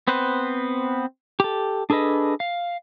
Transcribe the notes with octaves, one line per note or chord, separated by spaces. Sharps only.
B3 C4 B4 C5 F#6
G4 A4
D4 G#4 A4 B4 D#5
F5